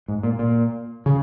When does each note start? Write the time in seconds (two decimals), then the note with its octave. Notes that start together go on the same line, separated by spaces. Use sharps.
0.08 G#2
0.23 A#2
0.39 A#2
1.06 C#3